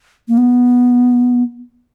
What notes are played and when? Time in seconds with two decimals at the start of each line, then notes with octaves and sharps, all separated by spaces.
0.28 A#3
0.38 B3